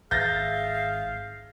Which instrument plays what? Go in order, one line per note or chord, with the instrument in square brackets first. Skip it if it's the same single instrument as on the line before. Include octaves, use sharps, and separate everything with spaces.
[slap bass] G#1 [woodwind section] G#4 E5 F5 [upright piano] G6 A6 A#6